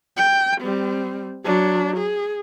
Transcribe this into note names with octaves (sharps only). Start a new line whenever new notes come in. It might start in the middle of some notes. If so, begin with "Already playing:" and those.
G5
G3 C4
F#3 D4
G#4